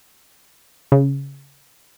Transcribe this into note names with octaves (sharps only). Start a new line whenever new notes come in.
C#3